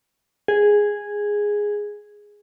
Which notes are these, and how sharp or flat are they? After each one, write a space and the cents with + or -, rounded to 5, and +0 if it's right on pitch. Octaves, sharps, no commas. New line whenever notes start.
G#4 -5